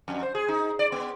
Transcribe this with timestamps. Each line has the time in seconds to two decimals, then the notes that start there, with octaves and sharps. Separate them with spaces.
0.08 F2
0.23 C5
0.35 G#4
0.48 D#4
0.79 D5
0.92 B3